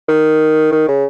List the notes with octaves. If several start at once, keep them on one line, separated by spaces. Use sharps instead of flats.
D#3
D#3
C#3